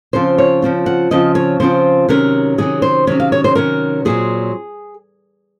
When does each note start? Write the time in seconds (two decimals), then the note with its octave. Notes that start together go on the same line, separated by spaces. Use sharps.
0.13 C#3 F3 C4 F4 C5
0.38 C#5
0.62 C#3 F3 C4 F4
0.86 F#5
1.11 C#3 F3 C4 F4 D#5
1.35 C#5
1.60 C#3 F3 C4 F4 C5
2.09 C3 D#3 F#3 C#4 A#4
2.58 C3 D#3 F#3 C#4 G#4
2.82 C5
3.07 C3 D#3 F#3 C#4 C#5
3.20 F5
3.32 C#5
3.44 C5
3.55 C3 D#3 F#3 C#4 A#4
4.05 A#2 F#3 C4 G#4